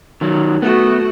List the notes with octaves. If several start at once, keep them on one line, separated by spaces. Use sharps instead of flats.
D#3 F#3
A3 B3 F#4